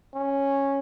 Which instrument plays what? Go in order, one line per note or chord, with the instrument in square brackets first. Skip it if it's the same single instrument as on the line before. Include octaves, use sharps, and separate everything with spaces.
[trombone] C#4